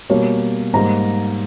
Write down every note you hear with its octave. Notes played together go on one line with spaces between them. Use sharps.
B2 G3 A#3 C#5
G#2 G3 A#3 A#5